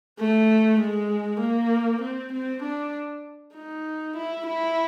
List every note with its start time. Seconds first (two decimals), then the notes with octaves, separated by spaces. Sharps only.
0.19 A3
0.80 G#3
1.40 A#3
2.02 C4
2.33 C4
2.63 D4
3.55 D#4
4.17 E4
4.47 E4